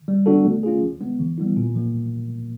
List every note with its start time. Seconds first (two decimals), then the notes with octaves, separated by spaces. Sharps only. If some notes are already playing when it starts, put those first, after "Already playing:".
0.08 G3
0.26 B3 D4 F#4 A4
0.45 A3
0.63 C#4 F4 G#4
0.82 F3
1.01 G#3 B3
1.19 E3
1.38 G3 B3 E4
1.57 A#2
1.75 F3 A#3